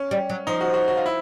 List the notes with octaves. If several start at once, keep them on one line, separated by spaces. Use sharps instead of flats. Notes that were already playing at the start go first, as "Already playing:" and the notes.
Already playing: C#4
G3
F#3
F3 D#4
F#4
F#4
F#4
F4
E4